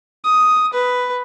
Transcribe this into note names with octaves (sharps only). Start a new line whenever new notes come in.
D#6
B4